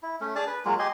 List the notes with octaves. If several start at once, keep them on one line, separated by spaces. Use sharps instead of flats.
E4
A3 C#4
D4 G#4 D5 A5
B4
F#3 G#3 A#3 F4
G4 D#5 G#5 C6